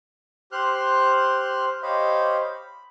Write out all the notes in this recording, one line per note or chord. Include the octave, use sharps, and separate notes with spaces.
G4 C5 C6 F6 F#6
G4 C5 C#5 D#5 F5 B5
B5